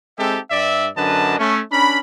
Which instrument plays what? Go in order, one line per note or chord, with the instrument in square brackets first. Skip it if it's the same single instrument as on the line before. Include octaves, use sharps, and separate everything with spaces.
[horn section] G#3 C4 D#4 G4 A4 E5
G2 D5 E5
F#2 D3 D4 B4 D#5 A5
A3 C#4
C#4 D4 A#4 B5